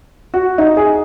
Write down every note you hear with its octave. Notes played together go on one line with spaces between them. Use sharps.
F#4
D#4
G#4